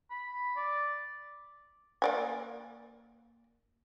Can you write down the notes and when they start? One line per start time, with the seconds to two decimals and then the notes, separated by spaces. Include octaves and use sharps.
0.10 B5
0.56 D5
2.02 A#3 D5 G#5